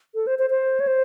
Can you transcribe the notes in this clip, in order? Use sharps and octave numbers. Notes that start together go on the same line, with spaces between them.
A4
C5
C5
C5
C#5
C5